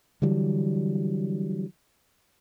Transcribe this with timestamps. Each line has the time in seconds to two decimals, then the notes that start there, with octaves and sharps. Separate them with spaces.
0.22 D3 E3 F#3 G3